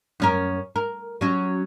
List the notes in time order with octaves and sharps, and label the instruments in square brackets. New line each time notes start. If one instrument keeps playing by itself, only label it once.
[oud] F#2 C#4 A#4
A#4
F#3 C#4